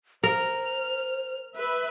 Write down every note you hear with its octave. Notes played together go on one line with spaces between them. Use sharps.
A#4 C5 F6
B4 E5